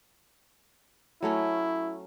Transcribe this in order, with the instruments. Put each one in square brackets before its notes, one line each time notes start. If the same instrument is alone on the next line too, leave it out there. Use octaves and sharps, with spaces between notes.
[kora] F#3 A3 C#4 [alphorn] E4